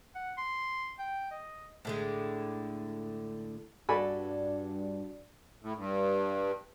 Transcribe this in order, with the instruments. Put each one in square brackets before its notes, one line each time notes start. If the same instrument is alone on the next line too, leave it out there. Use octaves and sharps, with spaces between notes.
[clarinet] F#5
C6
G5
D#5
[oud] A2 D3 G#3
[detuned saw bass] G2 [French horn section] D4 [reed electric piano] F#4 D5 [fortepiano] A4 G#5 B5
[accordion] A2
G2